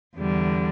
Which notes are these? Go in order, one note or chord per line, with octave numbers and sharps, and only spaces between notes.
E2 D3 G3